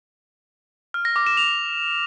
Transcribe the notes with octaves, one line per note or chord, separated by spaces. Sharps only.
F6
A#6
D6
E7
F7